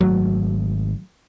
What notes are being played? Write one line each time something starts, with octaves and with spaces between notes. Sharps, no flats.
G#1 F#3 A3